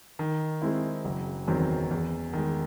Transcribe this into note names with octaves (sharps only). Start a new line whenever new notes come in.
D#3
G#3 C4 E4
F#1
E2 D#3 F#3 C4
E2
D#3 G#3